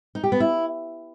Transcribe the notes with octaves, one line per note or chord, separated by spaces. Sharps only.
D#4
G4
B3
E4